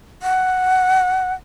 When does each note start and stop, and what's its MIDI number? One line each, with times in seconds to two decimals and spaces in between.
0.22 1.33 78